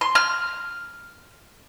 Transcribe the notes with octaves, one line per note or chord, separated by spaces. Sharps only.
C6
F6